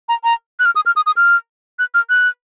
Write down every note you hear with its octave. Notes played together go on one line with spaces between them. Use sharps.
A#5
A#5
F#6
F6
D#6
F6
D#6
D#6
F6
F#6
F6
F#6